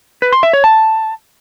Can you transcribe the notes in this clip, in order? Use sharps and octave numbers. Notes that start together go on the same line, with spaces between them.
B4
C6
E5
C#5
A5